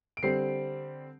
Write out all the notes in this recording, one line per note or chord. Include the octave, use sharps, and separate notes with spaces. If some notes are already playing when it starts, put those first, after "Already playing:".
D7
D3 G3 C4 C7